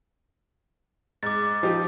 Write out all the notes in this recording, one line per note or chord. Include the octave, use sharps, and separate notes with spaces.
G#2 D6 A6
F3 D#4 G4